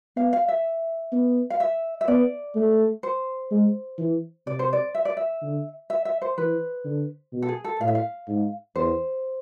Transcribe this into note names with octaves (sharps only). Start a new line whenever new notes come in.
B3 F5
F5
E5
B3
F5
E5
E5
B3 D5
A3
C5
G#3
E3
C3 D5
C5
D5
E5
D5
E5
D3
E5
E5
C5
E3 B4
D3
B2
A4
G#4
A4
A2 F5
E5
F5
G#2
E2 C5